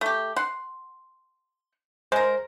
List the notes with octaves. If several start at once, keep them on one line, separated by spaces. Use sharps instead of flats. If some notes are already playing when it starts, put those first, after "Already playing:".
A3 G4
F#5 C6
G#3 A#4 C5